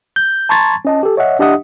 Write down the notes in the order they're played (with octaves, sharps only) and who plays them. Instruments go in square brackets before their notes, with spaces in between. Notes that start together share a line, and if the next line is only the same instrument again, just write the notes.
[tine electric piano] G6
A5 A#5 C6 C#6 G#6 A6
C#4 D#5 A5
G4 A4
C#5 D#5 E5 F#5
D4 G4 D#5 E5 F#5 D#6